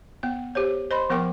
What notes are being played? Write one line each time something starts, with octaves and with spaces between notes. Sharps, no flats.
B3 G5
G4 C5 C#5
C5 D#5 B5 C6
F3 B3 A#4 G5 D6